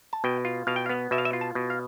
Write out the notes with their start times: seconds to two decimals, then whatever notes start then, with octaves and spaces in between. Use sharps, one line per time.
0.13 A5
0.24 B2 G5
0.45 F4
0.67 B2 F5
0.76 G5
0.86 F5
0.89 B3
1.11 B2 E5
1.18 F5
1.25 E5
1.33 F4
1.41 A5
1.55 B2
1.70 F5